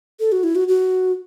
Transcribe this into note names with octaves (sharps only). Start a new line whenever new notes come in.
A4
F#4
E4
F#4
F#4